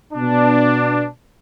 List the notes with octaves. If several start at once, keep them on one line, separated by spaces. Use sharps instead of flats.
B2 B3 D4